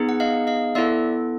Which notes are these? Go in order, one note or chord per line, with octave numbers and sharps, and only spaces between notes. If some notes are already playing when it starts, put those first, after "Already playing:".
Already playing: B3 D#4 G#4
F#5
D#5 F5
D#5 F5
B3 E4 A4 D5 E5